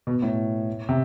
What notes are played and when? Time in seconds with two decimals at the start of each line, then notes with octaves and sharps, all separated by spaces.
0.07 B2
0.22 A2
0.89 C3